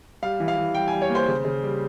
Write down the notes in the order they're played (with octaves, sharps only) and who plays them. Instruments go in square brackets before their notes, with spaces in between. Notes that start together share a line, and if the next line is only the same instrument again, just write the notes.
[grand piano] G3 F5
E3
F5
E3
G3 G5
G#5
G3
C#5
A#3
C5
C#3
C#3
G3